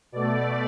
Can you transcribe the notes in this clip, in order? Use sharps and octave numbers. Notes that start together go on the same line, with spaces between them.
B2 A3 D5